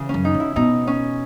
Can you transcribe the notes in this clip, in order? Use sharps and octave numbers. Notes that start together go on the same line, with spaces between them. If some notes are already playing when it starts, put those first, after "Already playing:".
Already playing: C#3 E3
C#4
F#2
D#4
C#3
E4
B2 D#4
C#4